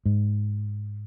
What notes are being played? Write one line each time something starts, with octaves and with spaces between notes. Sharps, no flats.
G#2